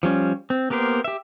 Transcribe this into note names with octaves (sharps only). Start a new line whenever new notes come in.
F3 G3 C#4
C4
A#3 B3 G4 A#4 C5
G4 E5